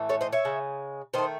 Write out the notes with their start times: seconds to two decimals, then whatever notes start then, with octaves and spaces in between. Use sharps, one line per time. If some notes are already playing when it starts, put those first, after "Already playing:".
Already playing: A2 E3 A3
0.09 A4 C#5
0.21 C5 D#5
0.33 C#5 E5
0.45 C#3 G#3
1.14 D#3 A3 C5 D#5